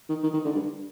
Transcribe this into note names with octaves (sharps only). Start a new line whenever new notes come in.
D#3
D#3
D#3
D3
G2